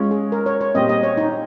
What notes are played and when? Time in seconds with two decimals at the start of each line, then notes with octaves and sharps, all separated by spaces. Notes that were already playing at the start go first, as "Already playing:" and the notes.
Already playing: G#3 C#4 F4
0.11 G#4
0.32 A#4
0.46 C#5
0.61 C#5
0.75 A#2 G3 C4 G4 D#5
0.89 D#5
1.03 C#5
1.17 D#4